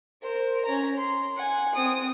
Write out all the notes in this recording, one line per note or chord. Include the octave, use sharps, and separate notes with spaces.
A#4 C5
C#4 A#5
C6
F#5 G#5
C4 D#6